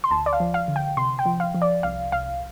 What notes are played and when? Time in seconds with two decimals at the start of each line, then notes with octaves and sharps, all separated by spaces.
0.04 C6
0.11 D2 A5
0.26 D5
0.33 F5
0.40 F3
0.54 F5
0.68 D3
0.76 G5
0.97 C3 C6
1.19 G5
1.26 F3
1.40 F5
1.55 F3
1.62 D5
1.83 C2 F5
2.12 C2 F5